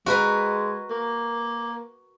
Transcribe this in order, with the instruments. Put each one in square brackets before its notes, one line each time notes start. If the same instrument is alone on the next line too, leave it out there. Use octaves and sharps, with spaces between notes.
[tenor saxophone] G#3 [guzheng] F#4 A#4 B4
[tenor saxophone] A#3